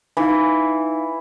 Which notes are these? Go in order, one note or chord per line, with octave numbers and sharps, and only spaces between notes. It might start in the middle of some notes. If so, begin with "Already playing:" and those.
E3 D#4 F5